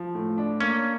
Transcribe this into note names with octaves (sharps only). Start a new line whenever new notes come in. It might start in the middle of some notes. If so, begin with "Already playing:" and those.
Already playing: F3
A2
D4
A#3 C#4